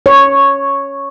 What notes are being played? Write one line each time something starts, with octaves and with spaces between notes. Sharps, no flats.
C#5